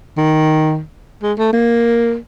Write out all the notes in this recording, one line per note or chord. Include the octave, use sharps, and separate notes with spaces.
D#3
G#3
A3
A#3